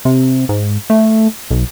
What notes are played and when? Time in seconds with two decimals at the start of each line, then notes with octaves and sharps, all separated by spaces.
0.05 C3
0.49 G#2
0.90 A3
1.51 B1